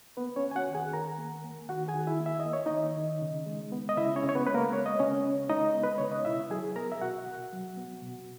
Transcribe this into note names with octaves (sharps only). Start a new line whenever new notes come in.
A#3 B3 B4
C#4 C#5
A#3
G#5
F#4 F#5
D#3
G#4 G#5
D#3 A#4 A#5
A#3
A#3
D#3 F#4 F#5
G#4 G#5
D#3
E4 E5
A#3
E5
D#5
A#3
C#5
D#3 D#4 D#5
D#3
C#3
G#3
B3
D#5
C#3 E4 E5
C#4 C#5
C#3
C#5
B3 B4
G#3 B4
A#3 A#4
B3 C#5
D#5
C#3 C#4 C#5
C#3
G#3 D#4 D#5
B3
B4
C#3 C#5
D#5
B2 E4 E5
F#3 G#4 G#5
B3 A#4 A#5
E5
B2 F#4 F#5
B2
F#3
B3
B2